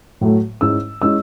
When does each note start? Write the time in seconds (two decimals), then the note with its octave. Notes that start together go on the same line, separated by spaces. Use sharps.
0.21 A2 F#3 A3
0.61 G#2 G#3 C#4 E4 E6
1.02 G#3 C#4 E4 E6